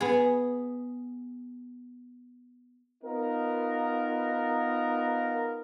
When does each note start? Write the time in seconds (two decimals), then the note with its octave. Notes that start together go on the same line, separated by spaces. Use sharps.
0.01 B3 G#4
3.04 B3 D#4 F4 A#4